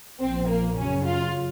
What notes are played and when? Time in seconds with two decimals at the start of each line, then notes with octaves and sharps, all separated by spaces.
0.21 A#1 A#2 F3 C4
0.48 A#3
0.77 F#2 C#3 F#3 C#4
1.06 F4